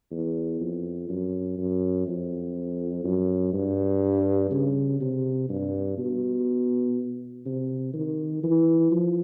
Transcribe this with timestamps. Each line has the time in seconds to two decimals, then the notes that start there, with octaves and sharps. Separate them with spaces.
0.11 E2
0.60 F2
1.09 F#2
1.58 F#2
2.07 F2
3.04 F#2
3.53 G2
4.51 C#3
5.00 C3
5.49 G2
5.98 B2
7.46 C3
7.94 D#3
8.43 E3
8.91 F3